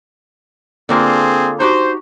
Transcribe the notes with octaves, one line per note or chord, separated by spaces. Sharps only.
D3 A#3 C4 F4 G#4
D#4 F#4 G4 C5